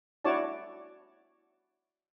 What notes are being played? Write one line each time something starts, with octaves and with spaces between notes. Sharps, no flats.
D4 E4 F#4 C#5 D5 A5